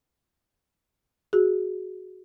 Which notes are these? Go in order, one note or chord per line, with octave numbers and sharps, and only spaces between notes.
F#4 G#4